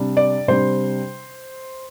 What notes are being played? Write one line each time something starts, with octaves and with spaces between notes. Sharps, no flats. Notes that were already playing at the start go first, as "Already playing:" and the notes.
Already playing: C3 G3 D4
D5
C3 G3 D4 C5